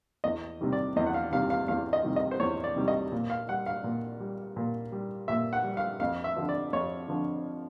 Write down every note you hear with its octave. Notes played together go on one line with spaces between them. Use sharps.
E2 D#5
C3 D#3 G3
D5
E2 D#5
F#5
F5
C3 D#3 G3 F5
F5
E2 F5
D#5
C3 D#3 G3
D#5
C5
E2 C#5
D5
C3 D#3 G3
D#5
A#2
F5
G3 F#5
F5
A#2
G3
A#2
G3
A#2 E5
F#5
G3
F5
F2 F5
E5
D3 F3
D5
F2 C#5
D3 F3